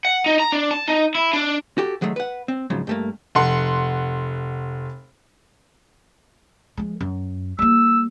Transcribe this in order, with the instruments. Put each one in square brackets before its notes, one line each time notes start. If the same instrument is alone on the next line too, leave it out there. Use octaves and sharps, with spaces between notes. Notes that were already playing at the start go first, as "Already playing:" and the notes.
[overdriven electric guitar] F#5
D#4
A#5
D4
A5
D#4
E4
D4
[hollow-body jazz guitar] F#4 G4 A4
D#2 F#3 G#3 A3
B4 F#5
C4
G#2 C#3 F3 F#3
G2 A3 A#3
[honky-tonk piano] F1 F#5 C6
[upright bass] F3 G#3
F#2
[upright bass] G3 A#3 [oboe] E6